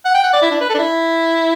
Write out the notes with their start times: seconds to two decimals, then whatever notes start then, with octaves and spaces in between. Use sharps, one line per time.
0.05 F#5
0.14 G5
0.23 F#5
0.33 D5
0.42 E4
0.51 D4
0.60 B4
0.69 A4
0.74 D4
0.79 E4